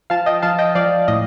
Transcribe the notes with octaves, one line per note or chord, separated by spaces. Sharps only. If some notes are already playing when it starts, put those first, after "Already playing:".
F3 F5 A5
D#5 G5
F3 F5 A5
D#5 G5
F3 D5 F5
A2 D#5